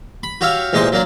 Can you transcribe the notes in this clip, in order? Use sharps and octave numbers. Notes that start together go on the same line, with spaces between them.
B5
F#4 G4 C#5 E5 F5
E2 A#2 G#3 G4 C5 D#5
F#3 A#3 D4